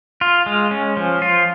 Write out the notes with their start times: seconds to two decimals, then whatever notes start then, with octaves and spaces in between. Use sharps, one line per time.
0.21 F4
0.46 G#3
0.71 C#4
0.97 F3
1.22 F4